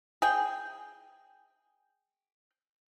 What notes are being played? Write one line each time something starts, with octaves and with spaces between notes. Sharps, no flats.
G#4 G5